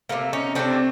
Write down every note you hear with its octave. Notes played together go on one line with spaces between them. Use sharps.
C3 F3 A3 A#3
C#4 D#4
C3 F3 A3 C4 D4